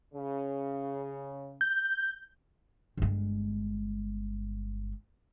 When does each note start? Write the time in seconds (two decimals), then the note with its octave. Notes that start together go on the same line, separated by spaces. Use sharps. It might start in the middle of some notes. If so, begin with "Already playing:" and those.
0.14 C#3
1.61 G6
2.97 G1 G#3